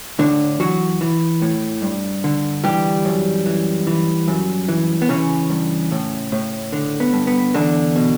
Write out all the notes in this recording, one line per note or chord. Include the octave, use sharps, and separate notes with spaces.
A2 D3 D4
E3 F#3 F#4
E3
A2
G2
D3
E3 G3 G4
F#2
E3
E3
F#2
E3
B3
C#3 E3 C#4
G2
A2
A2
D3
B3
G2
B3
E2 D3 D4
B2